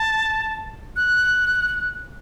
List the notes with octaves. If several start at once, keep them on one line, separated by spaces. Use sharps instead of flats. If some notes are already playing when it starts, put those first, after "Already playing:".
Already playing: A5
F#6